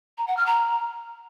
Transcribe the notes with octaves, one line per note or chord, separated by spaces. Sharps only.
A#5
F#5
F6
A#5